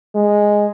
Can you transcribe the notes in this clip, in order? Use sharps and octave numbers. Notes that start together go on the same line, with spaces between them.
G#3